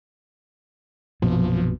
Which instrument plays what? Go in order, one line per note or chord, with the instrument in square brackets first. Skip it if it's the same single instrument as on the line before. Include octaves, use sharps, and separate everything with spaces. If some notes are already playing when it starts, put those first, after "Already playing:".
[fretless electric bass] A#1 F#2 B2 [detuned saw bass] F3